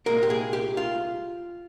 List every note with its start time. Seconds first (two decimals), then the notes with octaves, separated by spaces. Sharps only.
0.06 C2 A#2 G#3 A#4
0.23 G4
0.30 G#4
0.53 G4
0.77 F4